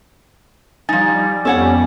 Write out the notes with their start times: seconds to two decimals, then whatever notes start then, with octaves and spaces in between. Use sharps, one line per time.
0.89 F3 G3 D#4 G#5 A6
1.45 F2 G3 B3 C#4 A4 C#5 F#5 G#5